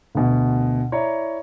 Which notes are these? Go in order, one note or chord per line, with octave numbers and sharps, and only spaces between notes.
D2 B2
E4 C#5 D5 A#5